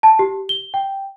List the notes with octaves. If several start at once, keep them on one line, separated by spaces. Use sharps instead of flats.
A5
G4
G7
G5